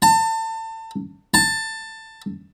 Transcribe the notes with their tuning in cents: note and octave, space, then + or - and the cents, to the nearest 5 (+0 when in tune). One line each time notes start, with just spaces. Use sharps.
A5 +30
A5 +15